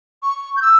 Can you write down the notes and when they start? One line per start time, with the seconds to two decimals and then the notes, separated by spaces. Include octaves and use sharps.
0.23 C#6
0.56 G6
0.62 E6